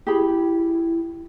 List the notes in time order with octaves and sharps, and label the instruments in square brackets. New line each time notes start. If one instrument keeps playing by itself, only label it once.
[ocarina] E4 [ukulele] G4 G#4 B5